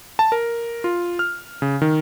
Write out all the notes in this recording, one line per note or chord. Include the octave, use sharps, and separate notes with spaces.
A5
A#4
F4
F6
C#3
D#3